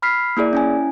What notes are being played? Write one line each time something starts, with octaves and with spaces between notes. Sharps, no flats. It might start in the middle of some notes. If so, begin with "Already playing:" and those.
B5 F6 B6 C7
A#3 E4 G#4 D5
C#4 E4 G#5